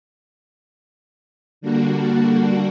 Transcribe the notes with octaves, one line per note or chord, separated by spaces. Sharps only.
D3 G3 A#3 D4 F#4